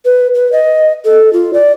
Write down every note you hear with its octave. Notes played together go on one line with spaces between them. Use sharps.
B4
B4
D#5
A4
F4
D5